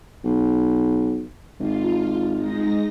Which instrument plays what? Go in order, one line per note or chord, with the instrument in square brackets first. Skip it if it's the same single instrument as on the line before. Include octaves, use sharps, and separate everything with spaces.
[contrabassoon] B1
[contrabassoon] G#1 [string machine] F4
[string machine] G#3 D#4 A#6